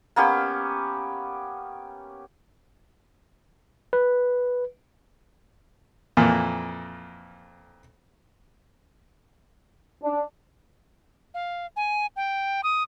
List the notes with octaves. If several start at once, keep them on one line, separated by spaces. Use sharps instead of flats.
A#3 B3 C#4 G4
B4
F2 A#2 E3 A#3
D4
F5
G#5
G5
D#6